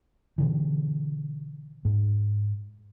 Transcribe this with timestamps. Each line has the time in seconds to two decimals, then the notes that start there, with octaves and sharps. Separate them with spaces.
0.38 B2 D3 E3
1.85 G#2